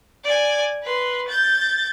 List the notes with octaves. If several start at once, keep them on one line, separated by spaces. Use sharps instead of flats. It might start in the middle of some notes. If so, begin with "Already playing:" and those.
D5 G#5
B4 C6
G6 A6